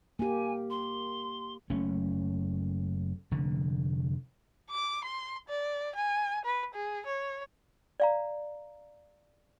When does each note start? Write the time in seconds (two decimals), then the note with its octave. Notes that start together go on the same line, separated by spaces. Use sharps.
0.19 A#3 G4 G#5
0.70 C6
1.70 F#1 A3 C#4
3.31 F1 D3
4.71 D6
5.04 C6
5.48 D5
5.95 G#5
6.45 B4
6.74 G#4
7.06 C#5
8.00 D5 F5 A#5